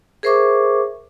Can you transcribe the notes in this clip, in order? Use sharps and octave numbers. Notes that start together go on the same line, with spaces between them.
G#4 A#4 C5 E5 C#6 D6